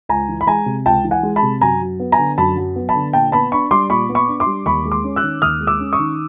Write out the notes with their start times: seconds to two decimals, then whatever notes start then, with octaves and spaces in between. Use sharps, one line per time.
0.09 C#2 G#5 A#5
0.29 E3
0.41 B5
0.47 G#3 G#5 A#5
0.66 C3
0.86 C#2 G5 A5
1.04 E3
1.11 F#5 G#5
1.23 G#3
1.36 A5 B5
1.43 C3
1.61 F#2 G#5 A#5
1.81 F#3
2.00 B3
2.12 G#5 A#5
2.18 D3
2.38 F#2 A5 B5
2.57 F#3
2.76 B3
2.89 A5 B5
2.95 D3
3.13 A#2 G5 A5
3.32 B3 A5 B5
3.52 D4 B5 C#6
3.71 G3 C6 D6
3.90 A#2 B5 C#6
4.09 B3
4.15 B5 C#6
4.28 D4
4.40 C6 D6
4.46 G3
4.66 D#2 B5 C#6
4.85 G#3
4.91 C6 D6
5.04 C#4
5.16 E6 F#6
5.23 D#3
5.42 D#2 D#6 F6
5.60 G#3
5.67 D6 E6
5.80 C#4
5.93 C#6 D#6
5.99 D#3